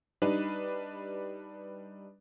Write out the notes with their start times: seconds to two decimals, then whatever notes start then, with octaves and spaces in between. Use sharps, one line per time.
0.22 G3 D4 D#4 B4